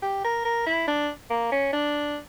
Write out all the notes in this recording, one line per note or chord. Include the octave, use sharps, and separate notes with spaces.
G4
A#4
A#4
E4
D4
A#3
C#4
D4